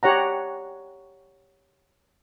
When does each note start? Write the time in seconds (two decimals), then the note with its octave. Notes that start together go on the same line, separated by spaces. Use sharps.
0.03 G4 C#5 F#5 A#5